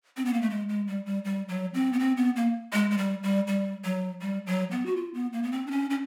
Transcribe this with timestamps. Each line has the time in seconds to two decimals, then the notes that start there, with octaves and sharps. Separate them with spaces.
0.17 C4
0.25 B3
0.33 A#3
0.42 A3
0.50 G#3
0.69 G#3
0.87 G3
1.06 G3
1.25 G3
1.48 F#3
1.74 C4
1.93 B3
1.99 C4
2.17 B3
2.36 A#3
2.73 G#3
2.91 G#3
2.97 G3
3.23 G3
3.47 G3
3.84 F#3
4.21 G3
4.47 F#3
4.71 B3
4.86 F#4
4.96 F4
5.14 B3
5.33 A#3
5.43 B3
5.52 C4
5.67 D4
5.71 C#4
5.90 C#4